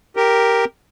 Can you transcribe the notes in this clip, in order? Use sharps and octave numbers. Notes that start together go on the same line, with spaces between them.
G4 A#4